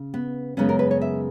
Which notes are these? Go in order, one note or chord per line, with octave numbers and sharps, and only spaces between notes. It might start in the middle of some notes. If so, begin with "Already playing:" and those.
Already playing: C#3
B3
F#2 C#3 G#3 B3 C#4
A#4
B4
C#5
E5